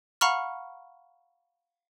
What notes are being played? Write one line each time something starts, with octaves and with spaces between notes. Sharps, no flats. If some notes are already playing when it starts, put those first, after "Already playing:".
F5 F#5 A#5 B5 C#6 F6